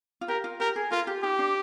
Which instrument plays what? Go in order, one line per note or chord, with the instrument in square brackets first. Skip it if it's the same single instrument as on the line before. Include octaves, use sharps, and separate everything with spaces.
[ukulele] F4
[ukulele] G4 [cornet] A#4
[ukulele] F4
[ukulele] G4 [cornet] A#4
[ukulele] G#4
[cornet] F4 [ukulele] A#4
[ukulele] G4
[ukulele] D#4 [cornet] G4
[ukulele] D4